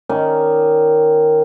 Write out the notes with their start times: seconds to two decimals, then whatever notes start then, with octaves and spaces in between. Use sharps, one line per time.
0.09 D#3 C#4 D5 G#5